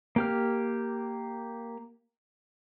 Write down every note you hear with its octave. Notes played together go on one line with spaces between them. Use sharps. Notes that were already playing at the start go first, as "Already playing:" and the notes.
A#3 G4 F6